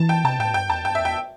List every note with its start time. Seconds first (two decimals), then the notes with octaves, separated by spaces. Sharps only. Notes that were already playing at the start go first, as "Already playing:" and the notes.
Already playing: E3 A5
0.09 G5
0.24 C3 A5
0.39 A2 G5
0.54 G2 G5
0.70 E2 A5
0.85 G2 G5
0.95 E5
1.00 E2
1.05 G5